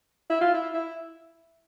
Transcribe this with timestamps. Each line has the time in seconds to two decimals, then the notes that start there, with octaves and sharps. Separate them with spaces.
0.30 E4
0.41 F4
0.54 E4
0.74 E4